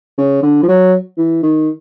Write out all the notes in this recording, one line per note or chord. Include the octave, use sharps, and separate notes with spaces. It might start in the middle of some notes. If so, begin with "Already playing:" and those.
C#3
D3
F3
F#3
E3
D#3